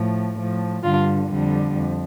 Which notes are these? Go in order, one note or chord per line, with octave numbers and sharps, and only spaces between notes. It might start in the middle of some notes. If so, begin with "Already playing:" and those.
Already playing: A2 F3
A2 F3
G2 D3 G3 F4
F2 D3 G3
F2